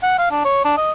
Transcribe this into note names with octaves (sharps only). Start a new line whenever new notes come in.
F#5
F5
D4
C#5
D4
D#5